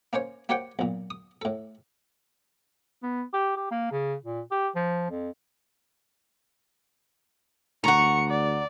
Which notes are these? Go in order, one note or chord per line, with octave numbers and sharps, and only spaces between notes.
A#3 C#4 C5 C#5
A#3 G4 C5 C#5 F#5 G5
B1 A#2
D#6
A2 A4
B3
G4
G4
A#3
C#3
A#2
G4
F3
F2
D2 F#5 A#5 C#6 C#7
D5